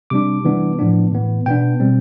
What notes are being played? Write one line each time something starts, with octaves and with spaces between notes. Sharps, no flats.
C3 G3 D4 D6
C3 E3 G3 B3 D4
A2 F3 B3 D4
A2 E3 B3
B2 B3 D4 G5
B2 G3 C4